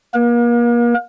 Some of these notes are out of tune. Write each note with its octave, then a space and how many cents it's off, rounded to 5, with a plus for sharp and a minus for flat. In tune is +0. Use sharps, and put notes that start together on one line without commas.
A#3 +30 A#4 +45